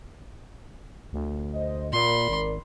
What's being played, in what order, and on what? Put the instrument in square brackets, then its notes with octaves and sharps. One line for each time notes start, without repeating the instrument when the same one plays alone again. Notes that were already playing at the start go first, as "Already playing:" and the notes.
[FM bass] D2
[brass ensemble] C5 D#5
[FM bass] A#2 [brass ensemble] A#4 D5 [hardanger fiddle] B5 C6
[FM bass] G#1